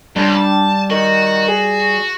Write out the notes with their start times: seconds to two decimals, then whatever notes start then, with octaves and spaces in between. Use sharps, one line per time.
0.16 C#2 G3 D4
0.35 A5
0.91 D#3 F#4
1.48 G#4